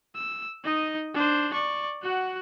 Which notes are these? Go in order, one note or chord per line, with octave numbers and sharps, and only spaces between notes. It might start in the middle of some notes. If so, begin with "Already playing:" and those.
E6
D#4 D#5
D4 C5
D5 C#6
F#4 F#5